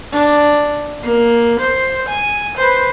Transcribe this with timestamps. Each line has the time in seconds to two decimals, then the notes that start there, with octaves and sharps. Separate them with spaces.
0.12 D4
1.03 A#3
1.60 C5
2.08 G#5
2.57 B4 C5